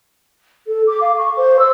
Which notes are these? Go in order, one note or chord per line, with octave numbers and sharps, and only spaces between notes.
A4
D6
F5
C#6
C5
E6